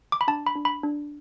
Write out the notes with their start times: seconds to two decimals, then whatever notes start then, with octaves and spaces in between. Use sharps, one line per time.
0.12 D6
0.21 B5
0.28 D4 A5
0.47 B5
0.56 D4
0.65 B5
0.83 D4